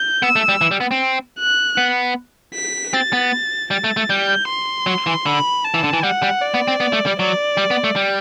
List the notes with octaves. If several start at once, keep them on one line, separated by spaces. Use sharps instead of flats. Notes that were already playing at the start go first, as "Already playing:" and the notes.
Already playing: G6
B3 E6
A3
G3
E3
G3
B3
C4
F#6
B3
B6
C4 A6
B3
G3 A6
A3
A3
G3 G6
C6
F#3
E3
D3 B5
A5
E3
D3
E3
G3 F#5
G3
D5
B3
C4
B3
A3
G3
F#3 D5
G3
B3
A3
G3